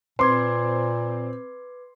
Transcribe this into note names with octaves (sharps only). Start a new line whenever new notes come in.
A#2 C4 B4 C6 D6 G#6